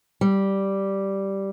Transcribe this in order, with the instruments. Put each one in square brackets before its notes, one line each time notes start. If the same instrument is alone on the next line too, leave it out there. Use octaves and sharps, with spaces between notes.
[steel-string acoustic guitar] G3